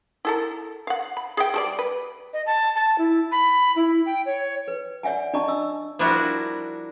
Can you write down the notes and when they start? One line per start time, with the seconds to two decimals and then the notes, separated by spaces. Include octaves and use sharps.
0.25 E4 A4 A#4
0.87 F5 F#5
1.17 B5
1.37 G#4 E5 G5
1.54 G3 A4 D5
1.79 B4
2.33 D#5
2.46 A5
2.75 A5
2.98 E4
3.32 B5
3.76 E4
4.06 G5
4.26 C#5
4.68 B4
5.03 C#5 D5 E5 F#5 G#5
5.33 D4 D5 D#5 A5 C#6
5.48 D#5 E6
5.99 F3 G3 D4 E4 F#4 A#4